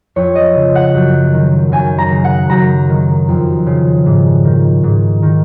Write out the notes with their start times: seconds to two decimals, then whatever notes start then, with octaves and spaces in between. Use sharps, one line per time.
0.16 F2 C#5
0.35 D#5
0.55 C#3
0.75 F#5
0.94 F#2
1.33 D#3
1.72 F#2 G#5
1.98 A#5
2.11 C#3
2.24 F#5
2.50 F#2 A#5
2.89 D#3
3.28 F2
3.66 C#3
4.06 G#2
4.45 D#3
4.83 G#2
5.22 D#3